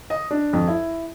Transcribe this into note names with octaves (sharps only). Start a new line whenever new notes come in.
D#5
D4
F2
E4